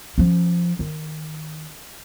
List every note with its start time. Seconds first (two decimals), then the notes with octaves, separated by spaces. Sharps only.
0.18 F3 C#4
0.79 D#3